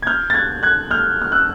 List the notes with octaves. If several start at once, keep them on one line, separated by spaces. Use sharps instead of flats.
G#6
F6 G6
A6
F#6 G#6
F#6 G#6
F6 G6
F6
E6 F#6